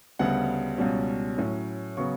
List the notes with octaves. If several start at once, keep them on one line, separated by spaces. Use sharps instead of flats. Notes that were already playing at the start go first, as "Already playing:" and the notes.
D2 C#3 G3 B3 F#5
C#2 B2 G3 C#4
A2 F#3 C#4
C#3 F#3 B3 C#6